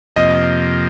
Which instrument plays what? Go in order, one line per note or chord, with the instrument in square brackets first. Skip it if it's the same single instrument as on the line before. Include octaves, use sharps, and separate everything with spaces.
[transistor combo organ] F2 C3 F3 A#3 [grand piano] D#5